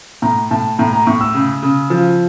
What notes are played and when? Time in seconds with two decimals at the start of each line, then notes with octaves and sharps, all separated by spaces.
0.22 A2 A#5
0.51 A2 A5
0.78 A2 A#5
0.93 A#5
1.07 A2 C#6
1.21 E6
1.34 C#3
1.63 C#3
1.90 F3